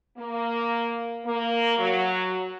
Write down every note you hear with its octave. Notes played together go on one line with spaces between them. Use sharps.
A#3
A#3
F#3